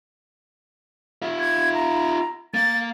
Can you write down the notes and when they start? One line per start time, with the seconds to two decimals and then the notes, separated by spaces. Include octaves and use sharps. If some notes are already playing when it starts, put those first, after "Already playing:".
1.22 F4 E5
1.40 G#6
1.74 A#5
2.54 A#3 A6